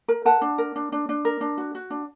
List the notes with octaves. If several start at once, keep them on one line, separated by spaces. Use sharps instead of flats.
A#4
A#4 F#5 A5
D4
A#4
D4
D4
D4
A#4
D4
F#4
F#4
D4